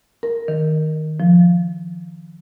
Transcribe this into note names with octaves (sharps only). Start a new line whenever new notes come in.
A#4
D#3
F3